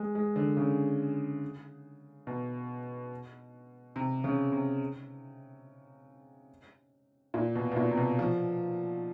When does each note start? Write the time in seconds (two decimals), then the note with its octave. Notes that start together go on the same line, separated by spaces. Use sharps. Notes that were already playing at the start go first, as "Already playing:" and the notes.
Already playing: G#3
0.15 G#3
0.36 D3
0.57 C#3
2.27 B2
3.96 C3
4.24 C#3
4.52 C3
7.34 A#2
7.55 B2
7.72 B2
7.76 A#2
7.91 C3
7.97 B2
8.19 F3